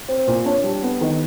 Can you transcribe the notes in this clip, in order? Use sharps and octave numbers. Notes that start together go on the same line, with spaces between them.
C4
A#2
D4 C#5
G3
B3
D#3